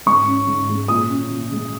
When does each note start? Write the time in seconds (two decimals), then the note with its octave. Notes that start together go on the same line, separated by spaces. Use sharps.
0.06 G#2 C#6
0.27 C#4
0.47 G#2
0.69 G#3
0.88 A#2 D#6
1.10 C#4
1.30 A#2
1.51 G#3